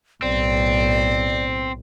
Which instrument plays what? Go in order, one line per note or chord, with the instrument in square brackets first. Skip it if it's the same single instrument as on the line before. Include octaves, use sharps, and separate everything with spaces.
[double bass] B1 A2 [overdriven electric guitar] C4 [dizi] D5